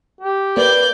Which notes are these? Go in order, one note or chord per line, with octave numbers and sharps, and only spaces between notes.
G4
A#3 B4 D5 G6